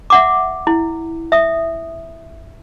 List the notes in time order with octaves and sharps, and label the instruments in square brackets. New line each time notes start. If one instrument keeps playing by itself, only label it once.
[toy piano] E5 F#5 D6
E4
E5 D#6